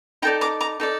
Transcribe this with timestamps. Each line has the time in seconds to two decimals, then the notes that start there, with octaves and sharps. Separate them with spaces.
0.22 D#4 A4 D5 G5 A#5
0.41 A#5 D6
0.61 A#5 D6
0.80 D#4 A4 D5